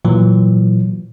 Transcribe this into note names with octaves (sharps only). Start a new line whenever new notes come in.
A#2 E3 F#3